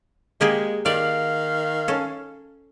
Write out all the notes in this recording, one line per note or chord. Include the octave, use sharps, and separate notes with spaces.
G#3 A#3 G4 G#4
D#3 D5 F5
C#4 A4